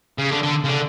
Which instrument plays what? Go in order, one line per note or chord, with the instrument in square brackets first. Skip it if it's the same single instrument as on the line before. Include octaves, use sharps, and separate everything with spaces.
[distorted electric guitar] C#3
D3
D3
C#3
D3